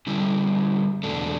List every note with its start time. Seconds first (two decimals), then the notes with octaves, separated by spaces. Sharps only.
0.07 D3 G3 C#4 E4
1.03 E2 B2 A3 D4